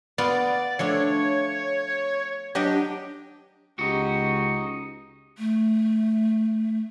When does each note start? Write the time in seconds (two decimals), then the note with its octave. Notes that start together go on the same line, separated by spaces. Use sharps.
0.18 B3 F4 D5
0.79 F3 A3 D4 C#5
2.55 F#3 D4 G4 D#5
3.79 C#2 D#4 F#4 G4
5.38 A3